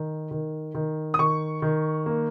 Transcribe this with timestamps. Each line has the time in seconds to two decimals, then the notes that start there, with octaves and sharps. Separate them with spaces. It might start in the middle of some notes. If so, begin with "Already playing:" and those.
Already playing: D#3
0.31 D#3
0.75 D#3
1.14 D#6
1.19 D#3 C#6
1.62 D#3
2.06 A#3